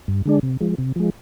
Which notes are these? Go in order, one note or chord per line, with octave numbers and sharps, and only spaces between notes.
G2
D3 G#3 D4
C3
F3 G#3
C3
F3 G#3